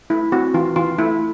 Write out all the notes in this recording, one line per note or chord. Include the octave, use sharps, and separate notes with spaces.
A3 E4
C4 F#4
E3 F4
E3 F4
A3 E4